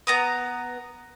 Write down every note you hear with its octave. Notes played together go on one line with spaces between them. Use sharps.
B3 A#5 D#6